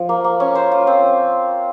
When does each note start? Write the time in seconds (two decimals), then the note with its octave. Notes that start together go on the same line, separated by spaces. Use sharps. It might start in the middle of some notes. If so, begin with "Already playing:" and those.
Already playing: F3
0.09 A#3
0.24 A#3
0.40 C#4
0.55 C5
0.72 F4
0.87 C4